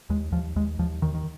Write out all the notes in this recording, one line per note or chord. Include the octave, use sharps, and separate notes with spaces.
D#2 G#3
D#2 F3
D#2 G#3
D#2 F3
D#2 D#3
D#3